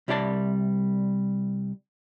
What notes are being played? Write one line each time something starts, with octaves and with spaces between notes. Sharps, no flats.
C2 G3 E4 D5 A5